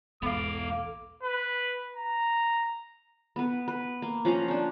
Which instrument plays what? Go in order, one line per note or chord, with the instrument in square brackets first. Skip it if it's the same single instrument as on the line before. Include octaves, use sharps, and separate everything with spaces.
[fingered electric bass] B1 E2 G#2 [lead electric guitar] B3 F5 [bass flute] A4 [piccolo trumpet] D6
[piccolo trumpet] B4
A#5
[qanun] B3 B4
B4
A#3
F3 C#4 F#5 A#5
C#4 D4